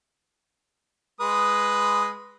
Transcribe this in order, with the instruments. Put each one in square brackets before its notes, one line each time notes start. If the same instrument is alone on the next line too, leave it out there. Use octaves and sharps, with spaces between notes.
[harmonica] G#3 B4 D#6